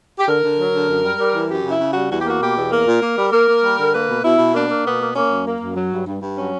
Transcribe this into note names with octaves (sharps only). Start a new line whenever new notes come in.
G4
D3 A#4
D3
F#3
D3
F#2
G3
G3
E3
F#2 G4
C#3
E4
C#3
G3 F#4
E2 F#4
G4
A#3 F#4
B2 G4
E2
A#3 A#4
A#2
A#3
G3
A#3 A#4
A#3
G3
D3
A#3 B4
B2
B2 E4
B2
A#3 D4
A#3
B2 B3
A#3
A#3 C#4
F#2
A#3
F#2
F#3
G2
G2
G2
F#3 C#4